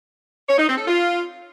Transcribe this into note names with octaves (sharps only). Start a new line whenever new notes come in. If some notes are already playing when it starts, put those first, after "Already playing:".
C#5
D#4
C4
A4
F4